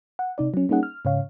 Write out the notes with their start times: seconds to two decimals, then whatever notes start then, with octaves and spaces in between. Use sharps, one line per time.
0.19 F#5
0.38 C3 D#4 D5
0.54 F#3 C#4
0.69 G3 A#3 C#4 D#4 G#4 F#5
0.83 F6
1.05 G#2 C#3 C#5 F5